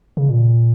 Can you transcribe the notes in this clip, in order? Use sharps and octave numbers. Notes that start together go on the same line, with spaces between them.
C#3
A#2